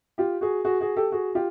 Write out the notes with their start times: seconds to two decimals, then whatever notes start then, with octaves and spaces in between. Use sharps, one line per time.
0.18 F4 G4
0.41 F#4 G#4
0.65 F#4 G#4
0.80 F#4 G#4
0.96 G4 A4
1.12 F#4 G#4
1.35 F4 G4